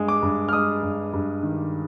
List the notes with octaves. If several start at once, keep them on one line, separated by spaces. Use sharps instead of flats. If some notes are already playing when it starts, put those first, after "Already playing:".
Already playing: G2 G#3
D6
G2
F6
G#3 D#6
G2
G2
D#3